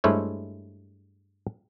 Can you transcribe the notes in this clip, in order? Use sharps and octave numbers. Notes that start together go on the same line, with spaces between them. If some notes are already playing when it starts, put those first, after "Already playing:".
G2 G#3 A3 E4 C5 C#5